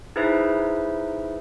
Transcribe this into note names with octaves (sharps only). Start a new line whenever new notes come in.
D#4 E4 G#4 B4 C5 E5